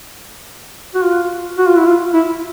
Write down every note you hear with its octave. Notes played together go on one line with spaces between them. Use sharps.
F#4
F4
F#4
F4
E4
F4
E4